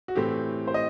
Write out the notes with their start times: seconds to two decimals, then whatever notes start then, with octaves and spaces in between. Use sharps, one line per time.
0.08 F#4
0.15 A2 E3 A3 C4 G4
0.68 C5
0.74 D#5